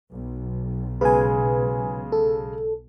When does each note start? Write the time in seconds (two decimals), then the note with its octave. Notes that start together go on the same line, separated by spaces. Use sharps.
0.14 B1
1.01 C#3 G#3 B4 G#5
2.12 A4